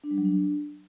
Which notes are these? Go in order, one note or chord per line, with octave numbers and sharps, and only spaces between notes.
D4
G3
F#3
D4